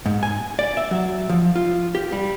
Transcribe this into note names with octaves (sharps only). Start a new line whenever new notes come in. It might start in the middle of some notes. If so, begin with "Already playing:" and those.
G#2
G#5
D5
E5
F#3
F3
F4
G4
G3